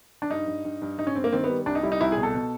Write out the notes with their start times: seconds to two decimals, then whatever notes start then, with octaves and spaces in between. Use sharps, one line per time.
0.22 D4
0.31 G2 D#4
0.47 G2
0.65 G2
0.82 G2
0.98 G2 D#4
1.07 C#4
1.15 G2 C4
1.24 A#3
1.32 D#3 C4
1.44 B3
1.49 G3
1.66 C2 D4
1.75 D#4
1.83 G3 E4
1.92 D#4
2.01 C2 E4
2.12 G#4
2.17 B2
2.23 A4
2.34 B2